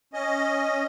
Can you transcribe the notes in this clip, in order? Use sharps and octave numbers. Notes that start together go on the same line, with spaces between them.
C#4 D#5